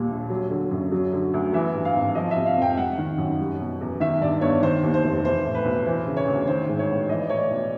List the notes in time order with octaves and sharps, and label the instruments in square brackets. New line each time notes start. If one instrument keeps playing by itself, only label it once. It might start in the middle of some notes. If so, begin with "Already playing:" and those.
Already playing: [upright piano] D#2 A#2 G3
A#1
F#3
D3
F#2
F#3
D3
D2
E3 E5
G2
F5
G#1
F3 D#5
C3 E5
F5
F2 G5
G3 F#5
D#3
F#2
G3
B2
E2
D#3 E5
G2 D5
G1 C#5
D#3 C5
D#2
C5
F1
E3 C5
A2
B4
B1
E3 C5
C#3
C#5
D2
D#3 C5
G#2
C#5
A1
E3 D#5
D5
A2 C#5
D5
B1